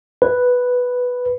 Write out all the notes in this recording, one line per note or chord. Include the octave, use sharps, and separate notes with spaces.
B4